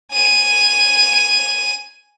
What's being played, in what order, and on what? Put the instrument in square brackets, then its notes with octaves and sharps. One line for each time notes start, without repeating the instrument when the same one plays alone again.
[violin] G#5 D#7